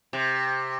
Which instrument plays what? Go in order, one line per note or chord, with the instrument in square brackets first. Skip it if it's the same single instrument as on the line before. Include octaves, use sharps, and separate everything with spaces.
[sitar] C3